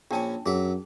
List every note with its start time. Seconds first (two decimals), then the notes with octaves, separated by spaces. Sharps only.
0.11 A#1 C#4 D4 G5 A5 C#6
0.46 F#2 F#3 G#4 E5